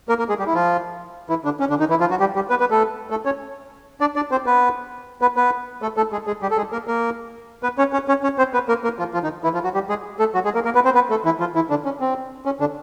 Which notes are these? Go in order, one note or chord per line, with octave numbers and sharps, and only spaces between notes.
A#3 A#4
A#3 A#4
G#3 G#4
G3 G4
E4
F3 F4
E3 E4
D3 D4
C#4
D3 D4
D#3 D#4
E3 E4
F3 F4
F#3 F#4
G3 G4
G3 G4
B3 B4
B3 B4
A3 A4
A3 A4
C#4 C#5
D4 D5
D4 D5
C4 C5
B3 B4
B3 B4
B3 B4
A3 A4
A3 A4
G#3 G#4
G#3 G#4
G3 G4
A4
G#3 G#4
A#3 A#4
A#3 A#4
B3 B4
C#4 C#5
C#4 C#5
C#4 C#5
C#4 C#5
C4 C5
B3 B4
A#3 A#4
A#3 A#4
F3 F4
F3 F4
D#3 D#4
E3 E4
F3 F4
F#3 F#4
G3 G4
G#3 G#4
A3 A4
F#3 F#4
G#3 G#4
A#3 A#4
A#3 A#4
B3 B4
C4 C5
B3 B4
A3 A4
E3 E4
F3 F4
E3 E4
D3 D4
C#4
C4
C#4
D3 D4